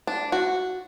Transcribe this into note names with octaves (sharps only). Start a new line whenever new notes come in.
D4
F#4